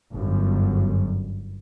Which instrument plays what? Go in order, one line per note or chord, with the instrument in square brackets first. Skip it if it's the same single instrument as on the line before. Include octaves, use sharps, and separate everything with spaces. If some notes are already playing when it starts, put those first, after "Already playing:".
[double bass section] G1 F#2